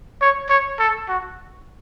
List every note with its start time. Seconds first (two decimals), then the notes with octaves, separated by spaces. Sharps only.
0.21 C#5
0.49 C#5
0.79 A4
1.08 F#4